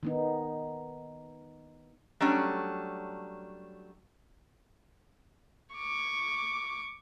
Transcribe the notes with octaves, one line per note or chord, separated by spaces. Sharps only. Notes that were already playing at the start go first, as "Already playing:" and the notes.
D#3 B3 D#4
F#3 G3 A3 C#4 D4
C#6 D6